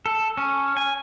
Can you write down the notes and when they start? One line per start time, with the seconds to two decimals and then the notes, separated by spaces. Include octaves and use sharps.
0.06 A4
0.37 C#4
0.77 G#5